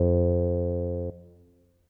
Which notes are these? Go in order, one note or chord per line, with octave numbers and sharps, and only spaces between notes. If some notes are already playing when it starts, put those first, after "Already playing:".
Already playing: F2